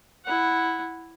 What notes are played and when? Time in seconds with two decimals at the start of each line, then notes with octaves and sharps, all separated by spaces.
0.25 E4 F#5